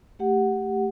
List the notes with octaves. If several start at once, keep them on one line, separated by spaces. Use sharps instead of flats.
A3 G4 F#5